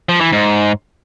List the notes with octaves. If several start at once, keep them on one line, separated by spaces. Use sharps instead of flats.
F3
E3
G#2